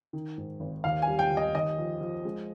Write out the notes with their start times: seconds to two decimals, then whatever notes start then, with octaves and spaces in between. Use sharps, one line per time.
0.13 D#3
0.38 G#2
0.60 G#1
0.84 D#2 F5
1.02 G#5
1.07 G3
1.19 G5
1.31 D#2
1.37 D#5
1.55 D#2 D#5
1.78 F3
2.01 F3
2.25 G#3